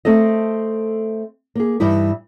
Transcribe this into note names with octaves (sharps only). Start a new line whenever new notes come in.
A3 C4 A4 D#5
A#3 G#4
G2 E3 G3 D#4 E4